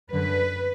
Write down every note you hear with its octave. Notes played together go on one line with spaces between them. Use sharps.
F#2 D3 B4